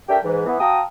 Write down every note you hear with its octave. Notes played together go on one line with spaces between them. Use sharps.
A3 D4 G4 A#4 E5 G5
G#2 E3
E3 B3
F#4 F5 G5 A5 A#5 D#6